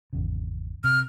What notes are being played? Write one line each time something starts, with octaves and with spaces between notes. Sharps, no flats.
G#1 E2 C#3
C3 F6